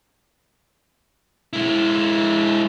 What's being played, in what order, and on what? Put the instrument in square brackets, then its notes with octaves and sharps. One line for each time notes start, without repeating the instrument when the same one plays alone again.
[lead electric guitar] G#3 E4